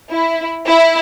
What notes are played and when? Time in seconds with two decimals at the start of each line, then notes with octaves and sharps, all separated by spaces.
0.12 E4
0.68 E4